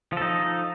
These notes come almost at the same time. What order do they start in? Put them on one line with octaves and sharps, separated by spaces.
F3 A4 D#4